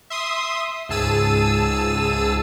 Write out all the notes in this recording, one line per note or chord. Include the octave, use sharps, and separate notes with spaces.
E5 C6 D#6
C#2 G#2 G#4 A5 E6 D#7